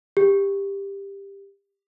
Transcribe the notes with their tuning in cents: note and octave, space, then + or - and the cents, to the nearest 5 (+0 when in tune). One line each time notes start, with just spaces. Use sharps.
G4 +15